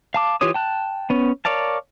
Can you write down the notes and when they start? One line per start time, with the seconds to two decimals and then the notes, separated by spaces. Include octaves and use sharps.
0.14 F5 A5 D6
0.41 E3 F4 G4 C#5 D#6
0.54 G5 A5 F#6
1.10 B3 C#4
1.45 A#4 C#5 D5 F5 A5